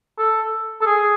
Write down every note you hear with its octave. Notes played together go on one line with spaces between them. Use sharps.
A4
A4
G#4